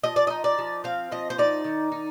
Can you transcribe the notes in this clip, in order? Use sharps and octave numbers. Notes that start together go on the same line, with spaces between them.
F3 D#5
D5
D#4 D#5
D5
F3
C4 F5
F3 D#5
C5
D#4 D5
D#3
D#4